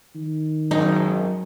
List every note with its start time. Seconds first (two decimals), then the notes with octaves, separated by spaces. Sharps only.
0.15 D#3
0.71 G#1 F#2 D#4